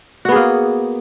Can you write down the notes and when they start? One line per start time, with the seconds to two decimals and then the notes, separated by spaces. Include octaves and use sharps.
0.25 F#4
0.29 B3
0.32 G#4
0.36 A#3